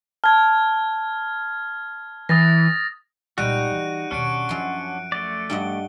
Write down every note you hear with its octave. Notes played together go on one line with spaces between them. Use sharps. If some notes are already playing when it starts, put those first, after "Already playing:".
A5 F6 G#6
E3 D#6 A6 A#6
C#2 A#2 G3 D#4 F#4 F#6 D7 D#7
E3
D#2 B2 C#4 D4 F#4 C#7 D7
F#2 F3 C6
A3 D5
G2 F#4 D#5 G7